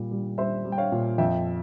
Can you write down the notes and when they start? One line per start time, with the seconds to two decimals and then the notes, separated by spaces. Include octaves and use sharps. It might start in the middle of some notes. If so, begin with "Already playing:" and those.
Already playing: A#2 G3
0.11 G3
0.38 G3 C5 E5
0.65 G3
0.72 G5
0.78 C#5 F5
0.92 A#2
1.18 F2 E5 G5